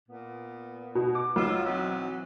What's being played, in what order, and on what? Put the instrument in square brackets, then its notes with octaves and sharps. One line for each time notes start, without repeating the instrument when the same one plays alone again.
[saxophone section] A#2 B3
[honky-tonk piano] B2
D6
[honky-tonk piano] B1 E6 [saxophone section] F4
[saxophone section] E3 F#3 C4